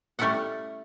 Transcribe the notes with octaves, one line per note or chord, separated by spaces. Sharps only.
G3 A3 C#4 E4 A4 F#5